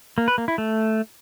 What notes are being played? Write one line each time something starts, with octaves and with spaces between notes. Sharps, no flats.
A#3
B4
A#3
E4
A3